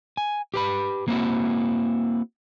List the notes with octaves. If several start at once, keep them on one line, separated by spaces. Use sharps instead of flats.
G#5
G4 B4 B5
A#3 C4 E4 F#4